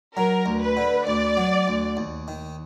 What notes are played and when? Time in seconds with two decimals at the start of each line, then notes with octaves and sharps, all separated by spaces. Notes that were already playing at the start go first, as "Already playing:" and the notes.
0.16 F#3 A#4
0.46 D2
0.62 B4
0.77 D3
1.07 D2 D5
1.37 F#3
1.68 D2
1.97 D#2
2.28 D#3